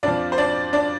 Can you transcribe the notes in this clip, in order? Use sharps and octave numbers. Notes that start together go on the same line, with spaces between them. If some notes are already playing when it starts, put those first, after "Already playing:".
F2 F3 D4 D5
C5
D4 D5
D4 D5